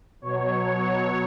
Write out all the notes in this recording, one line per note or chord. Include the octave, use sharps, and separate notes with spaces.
B2 F#3 C#5